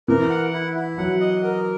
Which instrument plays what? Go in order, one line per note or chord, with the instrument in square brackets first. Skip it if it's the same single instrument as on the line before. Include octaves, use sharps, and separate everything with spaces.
[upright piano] E3 [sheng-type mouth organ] A#4
[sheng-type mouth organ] F#5
E4
E4
[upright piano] F#3 [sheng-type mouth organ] F#5
[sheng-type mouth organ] D#5
A#4